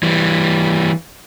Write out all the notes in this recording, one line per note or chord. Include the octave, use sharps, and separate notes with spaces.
E3 G3